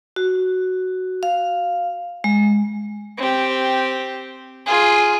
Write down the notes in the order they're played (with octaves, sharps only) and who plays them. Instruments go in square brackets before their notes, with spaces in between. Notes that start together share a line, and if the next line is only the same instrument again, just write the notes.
[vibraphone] F#4
F5
G#3
[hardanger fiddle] C4 G4
F4 G#4